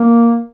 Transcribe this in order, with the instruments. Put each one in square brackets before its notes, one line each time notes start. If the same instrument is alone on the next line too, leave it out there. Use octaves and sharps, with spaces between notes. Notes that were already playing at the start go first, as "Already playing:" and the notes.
Already playing: [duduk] A#3